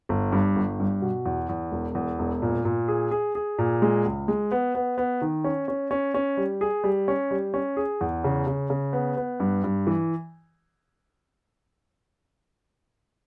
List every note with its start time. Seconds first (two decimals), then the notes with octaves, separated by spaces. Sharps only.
0.09 G1
0.32 G2
0.56 G1
0.80 G2
1.02 B2
1.26 E2
1.49 E2
1.72 E1
1.95 E2
2.19 E1
2.42 A#2
2.65 A#2
2.88 G#4
3.11 G#4
3.35 G#4
3.59 A#2
3.82 G#3
4.05 C#2
4.28 G#3
4.52 B3
4.75 B3
4.98 B3
5.22 D#3
5.44 C#4
5.68 C#4
5.91 C#4
6.14 C#4
6.37 G3
6.61 G#4
6.84 G3
7.08 C#4
7.31 G3
7.54 C#4
7.77 G#4
8.01 E2
8.24 C#3
8.47 C#3
8.70 C#3
8.93 B3
9.17 B3
9.40 G2
9.64 G2
9.87 E3